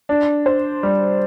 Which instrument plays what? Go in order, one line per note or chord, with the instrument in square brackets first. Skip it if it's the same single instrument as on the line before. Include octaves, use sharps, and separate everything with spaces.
[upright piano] D4
C5
G3